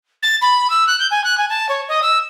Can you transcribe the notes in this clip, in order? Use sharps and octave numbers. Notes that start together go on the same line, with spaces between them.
A6
B5
E6
F#6
G6
G#5
F#6
G#5
A5
C#5
D#5
E6